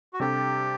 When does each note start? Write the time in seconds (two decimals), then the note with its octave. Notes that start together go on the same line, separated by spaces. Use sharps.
0.13 F#4
0.20 C3 G3 D4 G4 A4